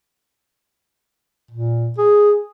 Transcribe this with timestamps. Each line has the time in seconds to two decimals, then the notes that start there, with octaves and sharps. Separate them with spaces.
1.51 A#2
1.98 G#4